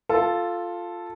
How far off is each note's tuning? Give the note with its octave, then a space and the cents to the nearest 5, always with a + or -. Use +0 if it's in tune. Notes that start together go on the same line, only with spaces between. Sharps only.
F4 +0 A4 +0